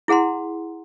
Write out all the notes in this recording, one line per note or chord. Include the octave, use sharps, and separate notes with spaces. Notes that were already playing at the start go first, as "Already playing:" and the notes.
E4 G#4 F#5 A#5 C6